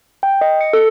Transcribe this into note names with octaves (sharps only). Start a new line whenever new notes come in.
G5
D#5
C#7
A4